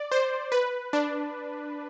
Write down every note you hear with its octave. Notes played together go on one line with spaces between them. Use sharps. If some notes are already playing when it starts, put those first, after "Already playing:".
Already playing: D5
C5
B4
D4